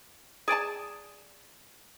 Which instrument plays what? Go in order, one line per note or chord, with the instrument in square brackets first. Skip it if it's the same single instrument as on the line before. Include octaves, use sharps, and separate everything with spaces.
[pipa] G#4 D5 G#5 A5